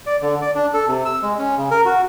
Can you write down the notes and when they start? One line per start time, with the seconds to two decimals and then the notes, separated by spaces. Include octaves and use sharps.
0.06 D5
0.22 D3
0.42 D5
0.55 D4
0.74 A4
0.87 C3
1.05 E6
1.23 G#3
1.38 C#4
1.57 C#3
1.71 A#4
1.85 F#4